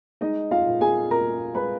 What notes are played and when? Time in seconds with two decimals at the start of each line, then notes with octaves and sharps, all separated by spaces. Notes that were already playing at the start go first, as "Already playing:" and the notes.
0.21 G#3 D#4 D#5
0.51 F4 F5
0.66 A#2
0.81 G#4 G#5
1.10 A#2 A#4 A#5
1.55 G#3 B4 B5